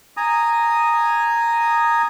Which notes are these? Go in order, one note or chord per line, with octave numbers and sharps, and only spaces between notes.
G#5 A#5 D#6